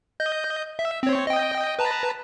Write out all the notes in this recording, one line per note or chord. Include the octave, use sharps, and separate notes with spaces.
D#5 G6
E5
C4 C#5
D#5 G5
B4 A5 A#5